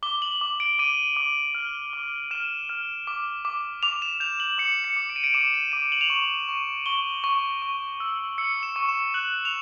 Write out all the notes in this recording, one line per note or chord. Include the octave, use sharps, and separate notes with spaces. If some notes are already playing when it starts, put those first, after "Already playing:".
D6 G7
F#7
D6
D7
D6 D#7
D6
F6
D6
F6 E7
F6
D6
D6
D6 F7
E7
G6 F7
F#7
D6 C#7
C#7
D6
D7
D#7
D7
D6 E7
D#7
D6 E7
F#7
F7
C#6 F#7
C#6
C#6 G7
C#6
C#6
E6
E6 C#7
E7
C#6
E7
F#6 F#7
F7